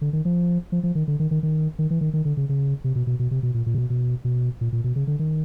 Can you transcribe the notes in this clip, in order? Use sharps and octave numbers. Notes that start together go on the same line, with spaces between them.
D3
D#3
F3
F3
F3
D#3
D3
D#3
D#3
D#3
D#3
E3
D#3
D#3
D3
C#3
C#3
C3
B2
B2
B2
C3
B2
A#2
A#2
C3
B2
B2
B2
A#2
A#2
B2
C#3
D3
D#3